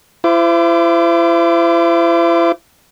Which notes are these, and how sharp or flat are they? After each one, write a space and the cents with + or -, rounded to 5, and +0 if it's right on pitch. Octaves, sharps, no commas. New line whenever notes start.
E4 +40 C5 -30 D6 +0